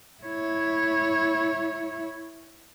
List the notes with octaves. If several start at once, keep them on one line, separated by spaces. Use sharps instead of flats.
E4 C#5